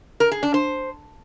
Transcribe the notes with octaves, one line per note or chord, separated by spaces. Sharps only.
A#4
G#4
D4
C5